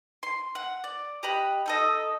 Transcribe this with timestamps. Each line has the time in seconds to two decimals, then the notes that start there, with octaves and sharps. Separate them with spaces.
0.23 C6
0.55 F#5
0.84 D5
1.23 G4 D#5 B5 F#6
1.66 D#4 A4 D#5